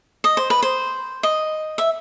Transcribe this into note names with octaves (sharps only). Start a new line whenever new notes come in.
D#5
C5
B4
C5
D#5
E5